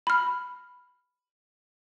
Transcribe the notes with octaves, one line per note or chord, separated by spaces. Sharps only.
B5 F6